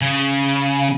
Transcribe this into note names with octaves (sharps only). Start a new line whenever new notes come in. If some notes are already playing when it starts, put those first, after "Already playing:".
C#3